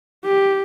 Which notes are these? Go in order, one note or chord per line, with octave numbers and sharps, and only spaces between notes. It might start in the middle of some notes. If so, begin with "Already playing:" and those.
G4